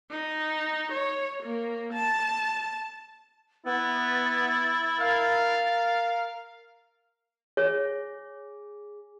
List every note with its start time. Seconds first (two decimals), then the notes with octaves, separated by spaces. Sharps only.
0.11 D#4
0.92 C#5
1.43 A#3
1.93 A5
3.66 B3 E4 A6
4.99 A#4 F5
7.57 G#4 C#5